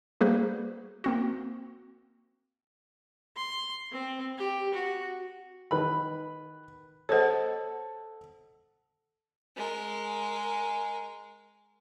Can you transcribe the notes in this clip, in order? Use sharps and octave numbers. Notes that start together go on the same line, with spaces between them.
G3 A#3 F#4 G#4 B4 C5
A#3 C4 F#4
C6
C4
G4
F#4
D#3 B4 B5
A4 C5 C#5 D#5 F#5
G#3 A#4